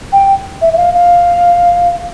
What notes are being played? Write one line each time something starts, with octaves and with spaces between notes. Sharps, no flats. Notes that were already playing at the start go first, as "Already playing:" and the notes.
G5
E5
E5
F5
F5